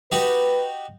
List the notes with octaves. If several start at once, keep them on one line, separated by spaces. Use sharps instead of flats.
D#4 F#4 G4 B4